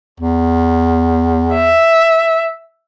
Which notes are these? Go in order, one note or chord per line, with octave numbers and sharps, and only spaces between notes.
E2
E5